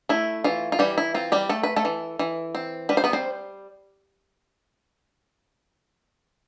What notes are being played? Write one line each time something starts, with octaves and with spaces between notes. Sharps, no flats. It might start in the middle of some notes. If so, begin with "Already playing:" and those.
A3 E4
E3 F4
F4
E3 G3 G4
E4
C4 F4
G3 G4
A3 A4
B4
A3 A4
E3
E3
C4
G3 B4
C5
B3 B4
C4 C5